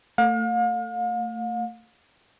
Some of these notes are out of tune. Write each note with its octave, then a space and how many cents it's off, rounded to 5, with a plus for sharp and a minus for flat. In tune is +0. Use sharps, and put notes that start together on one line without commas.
A3 +30 F5 +40